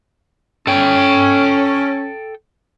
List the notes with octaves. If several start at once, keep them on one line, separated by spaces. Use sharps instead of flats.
C#4 A4 G5